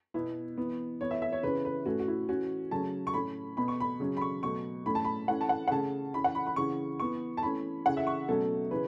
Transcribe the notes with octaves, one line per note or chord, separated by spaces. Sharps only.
B2 B3 E4
E3 B3
E3 B3 C#5
E5
E5
C#5
C#3 E3 C#4 B4
B4
A2 A3 C#4 F#4
F#4
E4
E3 C#4 F#4
C#3 F#3 A3 C#4 A5
C#6
A2 A3 C#4 B5
B2 B3 B5
C#6
B5
C#3 F#3 C#4
B5
C#6
B2 F#3 A3 C#6
A2 A3 C#4 B5
A5
B5
E3 A3 C#4 F#5
A5
F#5
F#5
C#3 A3 C#4 A5
E3 C#4 B5
F#5
B5
B5
C#3 E3 C#4 C#6
E3 B3 C#6
A5
E3 A3 C#4 B5
C#3 E3 C#4 F#5
E5
C#6
B2 F#3 A3 C#4 A4
C#3 E3 C#4 B4